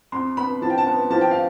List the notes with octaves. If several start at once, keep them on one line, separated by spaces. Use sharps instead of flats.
F2 C6
B3 B5
F3 A5
G5
A5
B3
F3 A5
G5
F5